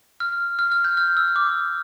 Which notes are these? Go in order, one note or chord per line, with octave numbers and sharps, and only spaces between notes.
F6
F6
F6
G6
F6
E6
D6